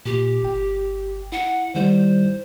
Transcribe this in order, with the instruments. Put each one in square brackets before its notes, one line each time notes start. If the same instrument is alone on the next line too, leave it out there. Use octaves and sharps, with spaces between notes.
[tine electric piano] A#2 [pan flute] G4
[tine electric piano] G1 G5
[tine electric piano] E4 [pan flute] F#5
[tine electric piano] D#3 G3 E4 [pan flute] C5